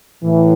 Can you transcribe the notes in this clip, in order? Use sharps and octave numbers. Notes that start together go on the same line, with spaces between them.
A2 E3